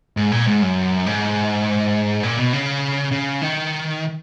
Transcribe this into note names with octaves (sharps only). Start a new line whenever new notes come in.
G#2
A#2
G#2
F#2
G#2
A#2
B2
C#3
C#3
D#3